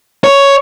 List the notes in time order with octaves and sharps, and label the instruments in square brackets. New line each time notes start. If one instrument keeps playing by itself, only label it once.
[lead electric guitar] C#5